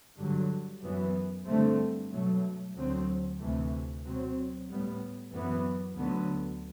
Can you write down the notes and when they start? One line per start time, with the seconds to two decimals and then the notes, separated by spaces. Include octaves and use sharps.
0.17 G2 D3 F#3
0.82 F#2 E3 B3
1.46 G2 D3 A3 C4
2.11 B2 F#3 A3
2.74 D2 D3 F#3 C4
3.38 D2 C3 E3 A3
4.03 B2 F#3 C4
4.68 A2 G3 B3
5.32 F#2 E3 B3
5.96 D2 D3 F#3 B3